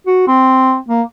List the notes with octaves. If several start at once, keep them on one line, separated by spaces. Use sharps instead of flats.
F#4
C4
A#3